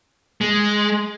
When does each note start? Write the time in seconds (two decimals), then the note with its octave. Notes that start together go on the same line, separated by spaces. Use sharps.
0.41 G#3